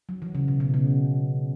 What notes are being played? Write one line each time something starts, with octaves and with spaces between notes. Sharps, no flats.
F#3
E3
C#3
B2
B2
C#3